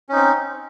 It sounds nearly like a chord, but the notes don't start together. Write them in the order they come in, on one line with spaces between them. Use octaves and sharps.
C#4 D#4 C4